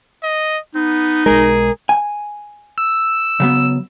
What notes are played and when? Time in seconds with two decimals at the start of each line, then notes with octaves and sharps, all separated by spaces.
0.23 D#5
0.75 B3 D#4
1.26 B1 G#3 G#4 A#4
1.89 G#5
2.78 E6
3.40 C#3 F#3 B3